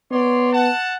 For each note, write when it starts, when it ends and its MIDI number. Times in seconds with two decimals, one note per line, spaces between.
0.12 0.70 59
0.12 0.50 73
0.12 0.50 74
0.12 0.50 84
0.53 0.95 78
0.53 0.95 81